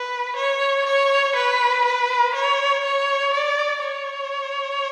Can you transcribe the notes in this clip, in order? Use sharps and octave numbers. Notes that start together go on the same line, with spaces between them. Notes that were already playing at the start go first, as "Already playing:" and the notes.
Already playing: B4
C#5
C#5
B4
B4
C#5
C#5
D5
C#5